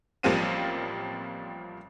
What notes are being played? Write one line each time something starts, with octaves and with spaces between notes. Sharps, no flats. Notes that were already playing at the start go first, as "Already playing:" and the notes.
A1 F3 G3 A#3 C4 D#7